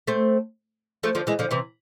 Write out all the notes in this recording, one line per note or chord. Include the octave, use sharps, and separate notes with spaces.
A3 C4
F3 A3
D3 F3
E3 G#3
D3 F3
C3 E3